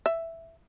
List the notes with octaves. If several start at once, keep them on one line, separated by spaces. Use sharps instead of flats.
E5